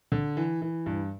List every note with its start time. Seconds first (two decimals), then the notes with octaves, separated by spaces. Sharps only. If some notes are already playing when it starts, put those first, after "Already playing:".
0.12 D3
0.37 E3
0.62 E3
0.86 G2